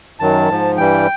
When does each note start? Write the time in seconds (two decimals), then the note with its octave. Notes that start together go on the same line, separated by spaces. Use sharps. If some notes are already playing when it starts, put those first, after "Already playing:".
0.20 F#2 D#3 F#3 A5
0.50 G#2 F3
0.77 G2 E3 G3 G5